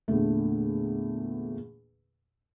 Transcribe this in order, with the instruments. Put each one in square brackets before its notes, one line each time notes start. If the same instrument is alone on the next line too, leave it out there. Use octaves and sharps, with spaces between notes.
[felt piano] E2 A#2 D3 A3